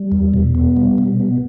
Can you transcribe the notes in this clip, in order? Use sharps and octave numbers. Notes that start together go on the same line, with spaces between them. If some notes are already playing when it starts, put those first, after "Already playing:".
Already playing: G3
E2
B2
B3
G3
B2
B3